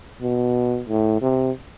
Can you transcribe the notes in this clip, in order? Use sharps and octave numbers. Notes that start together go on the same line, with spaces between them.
B2
A2
C3